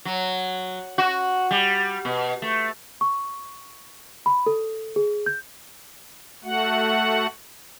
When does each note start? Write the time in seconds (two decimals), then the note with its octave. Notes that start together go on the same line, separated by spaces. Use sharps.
0.05 F#3
0.98 F#4
1.51 G3
2.05 B2
2.42 A3
3.01 C#6
4.26 B5
4.46 A4
4.96 G#4
5.26 G6
6.44 A3 F#4 F#5